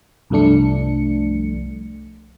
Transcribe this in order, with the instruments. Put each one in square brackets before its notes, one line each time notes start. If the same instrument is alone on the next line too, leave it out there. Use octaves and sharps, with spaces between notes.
[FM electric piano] C2 G2 F3 A3 D4 C#7